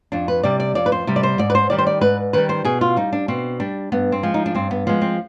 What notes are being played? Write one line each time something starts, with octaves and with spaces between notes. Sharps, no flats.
F2 D4
B4
C3 G3 D5
D5
F2 D5
B4
C5
C3 G3
D5
C5
G#2 D5
B4
C5
D#3 G3 D5
C5
D5
G#2 B4
D#3 G3 B4
C5
B2 G#4
F4
G3 D#4
D4
B2 C4
G3 D4
G2 B3
C4
F3 G#3
D#4
D4
G2 C4
B3
F3 G#3 B3
C4